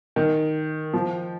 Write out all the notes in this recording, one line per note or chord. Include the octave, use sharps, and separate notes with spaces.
D#3
F3